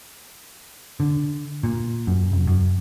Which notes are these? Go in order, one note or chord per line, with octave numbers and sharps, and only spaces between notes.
D3
A#2
F#2
F1
F#2